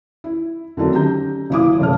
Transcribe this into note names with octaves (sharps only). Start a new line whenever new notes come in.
E4
D3 D#3 F#3 A3 C4
C#4 G4 A#5 G6
F#1 E3 E4 F5 D6 D#6
F1 C#3 A3 F6